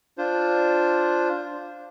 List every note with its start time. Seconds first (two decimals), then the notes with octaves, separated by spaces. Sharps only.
0.18 D4 F4 C5